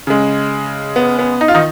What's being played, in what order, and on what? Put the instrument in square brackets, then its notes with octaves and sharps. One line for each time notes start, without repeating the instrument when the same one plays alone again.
[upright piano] C#3 G#3
B3
B3
D#4
F4
D#3 D#4